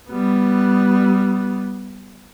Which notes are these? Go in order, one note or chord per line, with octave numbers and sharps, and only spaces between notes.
G3 B3